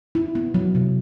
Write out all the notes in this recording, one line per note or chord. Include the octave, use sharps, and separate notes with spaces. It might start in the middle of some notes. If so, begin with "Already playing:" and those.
E4
B3
F#3
C3